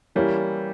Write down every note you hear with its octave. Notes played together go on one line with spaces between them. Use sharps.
E3 G3 A#3 C#4 E4